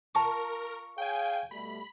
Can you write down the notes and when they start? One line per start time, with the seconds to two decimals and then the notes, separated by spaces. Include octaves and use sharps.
0.15 F4 A#4 A5 A#5 C#6
0.98 G#4 C#5 F5 G5 G#5
1.51 B2 G3 A3 B5